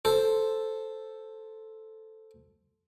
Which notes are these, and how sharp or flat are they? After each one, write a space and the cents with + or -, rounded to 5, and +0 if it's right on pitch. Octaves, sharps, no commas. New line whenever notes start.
A4 +0 C5 +0